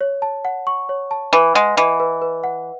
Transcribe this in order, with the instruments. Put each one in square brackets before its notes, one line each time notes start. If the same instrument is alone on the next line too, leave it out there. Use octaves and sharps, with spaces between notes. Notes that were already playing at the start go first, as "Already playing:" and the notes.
[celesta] C#5
A5
F#5
C#6
C#5
A5
[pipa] E3 [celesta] B4
[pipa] G#3 [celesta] F#5
[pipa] E3 [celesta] D#5
[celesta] B4
B4
F#5